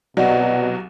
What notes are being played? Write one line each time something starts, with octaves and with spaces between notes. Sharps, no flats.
C2 B2 F#3 D5 D#5 F#5